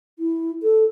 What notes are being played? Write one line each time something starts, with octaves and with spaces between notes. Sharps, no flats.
E4
A4